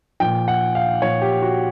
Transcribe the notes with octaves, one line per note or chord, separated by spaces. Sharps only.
A#2 F3 G5
F#5
F5
A#2 F3 C#5
G4
F#4